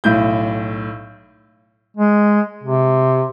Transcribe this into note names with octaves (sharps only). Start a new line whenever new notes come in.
B1 A2 G6
G#3
C3